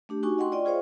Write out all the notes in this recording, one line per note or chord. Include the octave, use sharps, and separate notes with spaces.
A3 D4 G4
D#4 F#4 G#5 C#6 D6
D#5 F#5 G5 C6 C#6
F4 D5 D#5 G5
F4 G#4 C5 C#5 F5